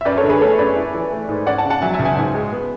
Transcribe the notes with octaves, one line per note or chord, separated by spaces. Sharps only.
E5
F#2 B4 D5
A4 C#5
D3
G#4 B4
A3 A4 C#5
F#2 B4 D5
E4
E3
A3
G#2
C#4 D5 F#5
F#5 A5
C#3
F#5 A5
F#3 E5 G#5
E5 G#5
C#2
E5 G#5
G#2
G#3
B3